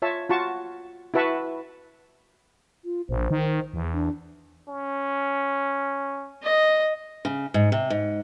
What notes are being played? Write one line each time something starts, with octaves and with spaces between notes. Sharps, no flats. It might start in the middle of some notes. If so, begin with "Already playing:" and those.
F4 C#5 E5 A5
F4 F#4 A5 C#6
E4 F#4 B4 E5 A5 C#6
F4
A#1 C5
D#3
E2
D4
C#4
D#5
C#3
G#2
C3
G#2